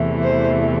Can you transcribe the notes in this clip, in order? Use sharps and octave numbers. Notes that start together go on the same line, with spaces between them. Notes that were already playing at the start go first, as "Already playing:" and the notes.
Already playing: E2 C3 E3 A3
C5